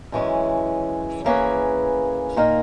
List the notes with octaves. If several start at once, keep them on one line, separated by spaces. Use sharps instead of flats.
F#2 E3 G#3 C#4
E3 A#3 C#4 G#4 B4
A#2 A#3 D#4 A#4